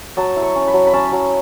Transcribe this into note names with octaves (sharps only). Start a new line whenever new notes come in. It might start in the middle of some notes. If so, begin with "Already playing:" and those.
F#3 A5
E4
C#6
C#4
B5
F#3
B5
C#4 A5
F#3